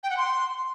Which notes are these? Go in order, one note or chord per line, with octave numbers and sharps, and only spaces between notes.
G5
F#5
C6